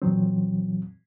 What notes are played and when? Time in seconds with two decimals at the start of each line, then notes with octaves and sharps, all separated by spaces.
0.02 A#2 E3 F#3 C4